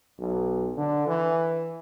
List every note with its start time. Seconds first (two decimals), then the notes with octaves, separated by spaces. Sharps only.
0.19 B1
0.76 D3
1.07 E3